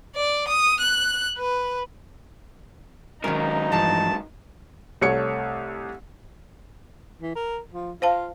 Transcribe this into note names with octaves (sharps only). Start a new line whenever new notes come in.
D5
D#6
F#6
B4
G#2 D#3 F#3 C#4 D#4 A#4
G2 E3 F3 A5
C2 A3 C#5 C#7
E3
A#4
F3
F4 C5 F5 A5